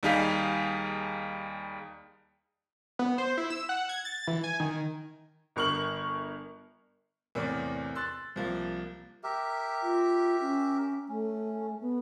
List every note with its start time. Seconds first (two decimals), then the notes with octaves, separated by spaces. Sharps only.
0.03 D#2 G3 D#4 G#4 F5 B6
2.99 B3
3.18 C5
3.37 E4
3.50 E6
3.69 F#5
3.89 G#6
4.05 A6
4.27 E3
4.44 G#5
4.60 D#3
5.56 G1 A#4 C#6 F6 F#7
7.35 E2 A2 C3 A#4 D5
7.95 C6 E6 F#6 A6
8.36 C2 F3 A#3
9.24 G4 A#4 E5
9.83 F4
10.41 C#4
11.08 A3 C#4
11.81 B3